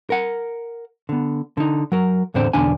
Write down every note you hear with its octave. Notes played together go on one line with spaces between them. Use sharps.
A#4 F#5
D3 B3
D3 D#4
F#3 A#4
E2 A2 D3 C4 C5 D5
B1 E2 D3 D4 G#5